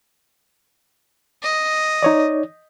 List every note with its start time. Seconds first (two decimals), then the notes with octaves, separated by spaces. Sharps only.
1.43 D#5
2.03 D#4 C#5 D5